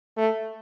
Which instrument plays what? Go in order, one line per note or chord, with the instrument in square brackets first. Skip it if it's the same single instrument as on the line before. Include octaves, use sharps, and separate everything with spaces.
[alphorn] A3